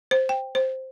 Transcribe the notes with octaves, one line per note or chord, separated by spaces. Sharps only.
C5
G5
C5